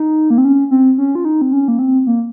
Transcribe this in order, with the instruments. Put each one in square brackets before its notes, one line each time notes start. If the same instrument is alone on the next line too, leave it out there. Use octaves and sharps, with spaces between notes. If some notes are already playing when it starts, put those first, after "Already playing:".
Already playing: [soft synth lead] D#4
A#3
C4
C#4
C4
C#4
F4
D#4
C4
C#4
A#3
C4
A#3